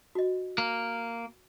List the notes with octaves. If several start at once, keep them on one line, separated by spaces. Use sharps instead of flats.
F#4 D#5
A#3